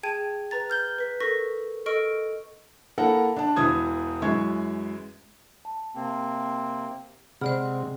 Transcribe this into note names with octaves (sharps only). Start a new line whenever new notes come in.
G#4 G5 A5 G#6 D#7
B4 A#5 A6
F6 G6 G7
B4 B6
A4 A#4 C#6 A#6 B6
A4 D#5 C#6 F6 D7
A#3 E4 A4 A#4 F#5
D4 A5
E1 E3 D#6 G#6
F#2 E3 G#3 E5 C#6 G#6
A5
C3 A#3 C4
C3 G#3 G#4 C5 D5 F#5 B5 F6